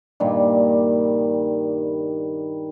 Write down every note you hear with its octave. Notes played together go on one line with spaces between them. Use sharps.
G2 A#2 D#3 G3